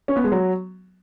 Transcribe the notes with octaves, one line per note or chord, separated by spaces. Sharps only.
C#4
B3
G#3
F#3